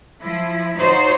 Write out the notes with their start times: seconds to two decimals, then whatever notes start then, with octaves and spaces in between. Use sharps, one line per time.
0.20 F3 E4
0.78 D#4 F4 F#4 C5 C#5